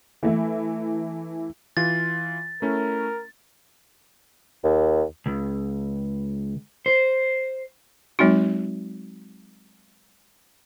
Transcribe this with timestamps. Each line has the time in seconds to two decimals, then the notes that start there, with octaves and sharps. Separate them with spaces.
0.23 E3 A3 E4
1.77 E3 F4 A6
2.62 A3 C#4 E4 A#4
4.64 D#2
5.26 C#2
6.86 C5
8.19 F#3 G#3 C4 D#4 F#4